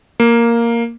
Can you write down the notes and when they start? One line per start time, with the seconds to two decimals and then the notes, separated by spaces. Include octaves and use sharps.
0.20 A#3